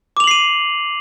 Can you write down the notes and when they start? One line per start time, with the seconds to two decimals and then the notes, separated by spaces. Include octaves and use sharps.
0.17 D6
0.20 F7
0.24 F#7
0.27 C7
0.31 D#7